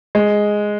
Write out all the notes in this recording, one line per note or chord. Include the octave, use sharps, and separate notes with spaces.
G#3